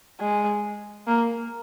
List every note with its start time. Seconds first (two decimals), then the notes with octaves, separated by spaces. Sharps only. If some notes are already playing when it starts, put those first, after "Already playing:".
0.20 G#3
1.07 A#3